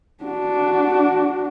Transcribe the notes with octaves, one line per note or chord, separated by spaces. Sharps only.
D4 F#4